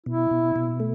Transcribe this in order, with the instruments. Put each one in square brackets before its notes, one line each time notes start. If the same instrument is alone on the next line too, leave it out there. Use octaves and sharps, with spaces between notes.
[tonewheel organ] B2 [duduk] E4
[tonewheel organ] B2
B2
A3